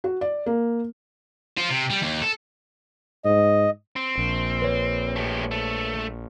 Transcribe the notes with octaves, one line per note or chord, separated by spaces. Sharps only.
F#4
D5
A#3
F4 C5
C3
G3
D#2
A4
G#2 D#5
C4
A#1
B4 C#5
A3 G4
A3